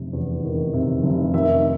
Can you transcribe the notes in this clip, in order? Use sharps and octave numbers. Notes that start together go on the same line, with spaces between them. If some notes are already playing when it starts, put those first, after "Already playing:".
Already playing: F1 C3
E2
D#3
C3
F1
D#3 E5